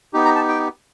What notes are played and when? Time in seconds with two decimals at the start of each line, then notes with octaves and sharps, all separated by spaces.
0.13 B3 D#4 G4
0.25 A#5
0.36 A5
0.48 G5